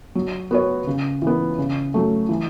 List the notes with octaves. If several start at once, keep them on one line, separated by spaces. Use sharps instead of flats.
F#3
B3 F#4 C#5
C#3
E3 B3
C#3
F#3 A3
E3